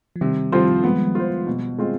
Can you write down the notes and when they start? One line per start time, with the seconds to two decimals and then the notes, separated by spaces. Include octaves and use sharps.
0.16 F3
0.21 C3 D#3 G3
0.52 D#3 F3 G3 C4 F4 C5
0.84 F3 G#3 B3
1.15 F4 C5
1.47 B2
1.79 G#3 C4 F4